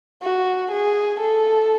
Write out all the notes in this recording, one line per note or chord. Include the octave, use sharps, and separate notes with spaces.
F#4
G#4
A4